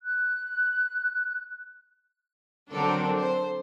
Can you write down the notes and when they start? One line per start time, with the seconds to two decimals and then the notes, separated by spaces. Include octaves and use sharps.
0.02 F#6
2.72 D3 F#3 C4 D4 A4 A#4
3.18 C5